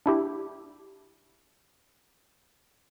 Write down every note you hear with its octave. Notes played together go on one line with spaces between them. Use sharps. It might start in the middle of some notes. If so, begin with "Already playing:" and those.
D4 E4 G4